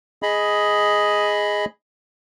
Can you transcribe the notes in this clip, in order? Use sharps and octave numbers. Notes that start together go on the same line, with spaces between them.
G#4 D#5 B5